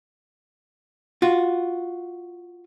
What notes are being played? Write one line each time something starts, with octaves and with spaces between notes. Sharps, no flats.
F4 F#4